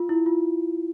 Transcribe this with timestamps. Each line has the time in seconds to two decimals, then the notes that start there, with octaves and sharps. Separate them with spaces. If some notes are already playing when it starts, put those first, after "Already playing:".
Already playing: F4
0.09 E4
0.26 F4